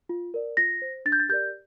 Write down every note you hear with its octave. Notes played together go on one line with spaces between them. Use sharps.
F4
A#4 D5
F4 A#6
C5
D4 A6
G6
A6
G4 A#4 D5 G6